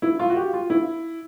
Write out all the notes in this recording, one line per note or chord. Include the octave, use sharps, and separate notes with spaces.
E4
F4
F#4
G4
F4
E4